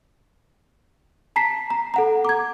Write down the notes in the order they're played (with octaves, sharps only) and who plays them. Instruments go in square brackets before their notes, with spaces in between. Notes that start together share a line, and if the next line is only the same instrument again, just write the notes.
[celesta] A5 A#5 B6 C7
A#5
A4 F#5 A#5
D6 G#6